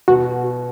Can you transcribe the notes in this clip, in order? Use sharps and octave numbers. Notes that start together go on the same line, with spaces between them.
B2 F#4